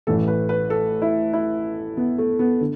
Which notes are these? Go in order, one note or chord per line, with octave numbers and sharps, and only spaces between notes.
A1 A2 E3 A4
B4
B4
A4
E4
E4
B3
A3
B3
D3